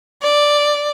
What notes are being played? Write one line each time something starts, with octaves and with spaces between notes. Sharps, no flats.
D5